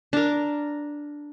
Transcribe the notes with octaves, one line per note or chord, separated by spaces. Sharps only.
D4 A#4